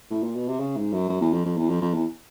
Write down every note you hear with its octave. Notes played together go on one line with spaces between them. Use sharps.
A2
A#2
B2
C3
C#3
G#2
F#2
F#2
E2
F2
F2
E2
F2
F2
E2